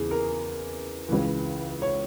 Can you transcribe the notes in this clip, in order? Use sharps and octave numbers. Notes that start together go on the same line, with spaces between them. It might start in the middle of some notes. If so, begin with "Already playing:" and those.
Already playing: E2 C#3 E3 G#4
A#4
C#2 C#3 E3
C#5